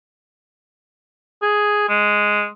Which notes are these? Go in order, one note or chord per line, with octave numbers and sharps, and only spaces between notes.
G#4
G#3